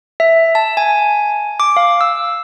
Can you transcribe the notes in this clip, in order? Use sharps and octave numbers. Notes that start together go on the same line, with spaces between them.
E5
A5
G#5
D6
F5
E6